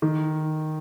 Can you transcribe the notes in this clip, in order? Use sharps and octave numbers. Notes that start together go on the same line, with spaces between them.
D#3